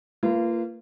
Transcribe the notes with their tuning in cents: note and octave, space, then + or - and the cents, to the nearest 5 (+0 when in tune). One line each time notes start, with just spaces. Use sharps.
A#3 -25 F4 -30 B4 +0